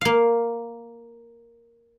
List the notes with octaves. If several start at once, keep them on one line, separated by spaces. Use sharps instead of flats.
A#3 F5